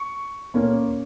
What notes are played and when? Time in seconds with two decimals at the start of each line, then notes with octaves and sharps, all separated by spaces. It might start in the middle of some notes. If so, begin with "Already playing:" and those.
Already playing: C#6
0.54 A#2 A#3 C#4